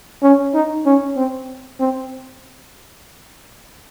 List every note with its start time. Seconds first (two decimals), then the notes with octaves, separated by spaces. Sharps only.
0.23 C#4
0.54 D#4
0.86 C#4
1.17 C4
1.80 C4